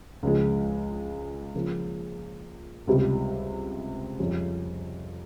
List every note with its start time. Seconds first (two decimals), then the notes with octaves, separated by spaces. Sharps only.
0.23 C#2 C#3 F3 G#3
1.55 C#3 F3 A#3 C#4
2.87 C#2 C3 G3
4.19 F2 C#3 G3 C#4 F4